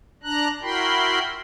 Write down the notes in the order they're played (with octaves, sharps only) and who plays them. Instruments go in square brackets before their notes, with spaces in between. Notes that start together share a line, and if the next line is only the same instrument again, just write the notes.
[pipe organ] D4 A#5 F#6
E4 F#4 A#4 G5 B5 C6